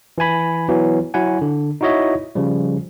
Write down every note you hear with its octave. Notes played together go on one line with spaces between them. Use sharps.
E3 E4 G#5 B5
E3 F#3 B3
F#3 E4 F#5 G#5
D3
D#4 E4 F#4 C#5 D#5 E5
C#3 F3 G3